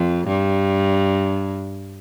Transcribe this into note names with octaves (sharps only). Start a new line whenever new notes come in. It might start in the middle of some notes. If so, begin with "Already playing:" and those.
Already playing: F2
G2